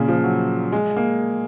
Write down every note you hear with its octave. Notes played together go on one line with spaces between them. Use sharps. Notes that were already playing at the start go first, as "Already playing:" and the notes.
Already playing: A#2 C#3
F3
F#3
G#3
A#3